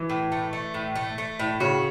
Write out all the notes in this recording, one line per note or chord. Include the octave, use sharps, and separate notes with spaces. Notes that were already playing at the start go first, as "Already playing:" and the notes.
Already playing: E3
A2
A3
A3
A2
A3
A3
A2
C#3 F#4